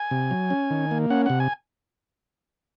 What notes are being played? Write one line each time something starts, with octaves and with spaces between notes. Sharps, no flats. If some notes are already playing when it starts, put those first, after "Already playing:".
Already playing: G#5
C3
F#3
C#4
D#3
A#3
C#4 F#5
C3 F#5
G#5